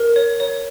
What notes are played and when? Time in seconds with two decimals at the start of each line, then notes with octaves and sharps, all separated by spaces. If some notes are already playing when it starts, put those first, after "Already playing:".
Already playing: A#4
0.16 C#5
0.40 C#5